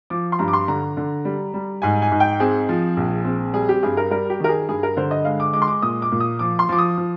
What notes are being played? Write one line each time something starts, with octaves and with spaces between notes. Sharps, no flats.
F3 D6
C6
G2 A#5
D6
C6
D3 A#5
D3
G3
G3
G#2 G#5
G#5
G#2
G5
C4 G#4
F3
A#1
C4
G3 G#4
G4
G2 G#4
A#4
G3 A#4
G4
D#3 A#4
G#4
G2 G#4
A#4
D3 C5
D#5
G#3 F5
D6
G#3 D6
C6
D6
A#2 D#6
D6
A#2
D#6
F3 D6
C6
F3 D6
D#6
F3